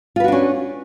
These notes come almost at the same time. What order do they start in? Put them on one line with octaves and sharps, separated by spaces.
F4 B4 F#4 D4 C#4